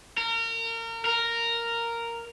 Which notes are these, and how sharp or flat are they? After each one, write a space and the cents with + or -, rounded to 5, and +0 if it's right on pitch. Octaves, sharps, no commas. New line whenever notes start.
A#4 -30
A#4 -5